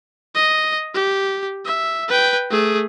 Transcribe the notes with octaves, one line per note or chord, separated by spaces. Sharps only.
D#5
G4
E5
B4 G5
A3 G#4